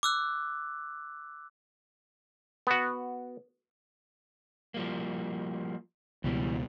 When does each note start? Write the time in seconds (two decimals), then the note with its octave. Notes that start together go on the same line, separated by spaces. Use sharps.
0.03 D6 E6 F#6
2.67 B3 F#4
4.74 F3 G3 A#3
6.24 C#2 B2 E3 G3